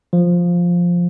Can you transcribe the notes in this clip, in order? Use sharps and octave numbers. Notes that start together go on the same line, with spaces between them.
F3